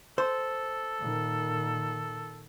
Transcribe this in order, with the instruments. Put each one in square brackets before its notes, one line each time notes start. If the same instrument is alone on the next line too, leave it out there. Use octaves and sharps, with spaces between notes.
[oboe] A4 [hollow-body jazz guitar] C5
[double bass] A#2 D#3